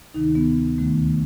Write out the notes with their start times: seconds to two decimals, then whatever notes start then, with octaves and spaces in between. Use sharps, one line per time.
0.13 D2 C3 D#3 D#4
0.35 B3
0.78 D#2 D#3 A3